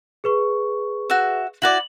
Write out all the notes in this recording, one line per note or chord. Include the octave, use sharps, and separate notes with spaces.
G#4 B4 C#6
F#4 E5
E4 F#4 D5 F#7